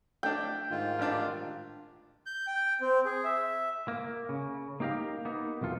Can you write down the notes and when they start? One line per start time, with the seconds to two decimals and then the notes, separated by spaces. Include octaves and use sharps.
0.23 A3 D4 G5
0.71 G#2 D#3 F4
0.99 A1 D4
2.26 G6
2.47 G5
2.81 C4
3.05 G#4
3.24 E5
3.88 A#3
4.29 C#3
4.80 A#3 D#4 G4 A#4 F5
5.25 A#3 B3 D#4
5.61 B1 E2 C3 F4 A4